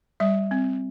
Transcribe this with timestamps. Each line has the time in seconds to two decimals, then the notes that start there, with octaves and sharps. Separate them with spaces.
0.20 G3 E5
0.51 C4